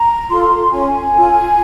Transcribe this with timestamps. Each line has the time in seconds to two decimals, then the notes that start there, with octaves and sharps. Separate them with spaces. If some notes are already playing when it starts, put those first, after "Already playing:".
Already playing: A#5
0.29 F4 A4 C6
0.71 C#4 G#5
1.13 F4 A4